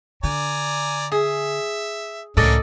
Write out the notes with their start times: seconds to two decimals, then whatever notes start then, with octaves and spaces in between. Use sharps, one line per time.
0.24 D3 D5 G#5 A#5
1.12 G#4 E5
2.37 C#2 A2 A#3 C#4 D4 A4 D5 D#5